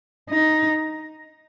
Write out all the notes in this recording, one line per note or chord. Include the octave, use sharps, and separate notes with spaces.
D#4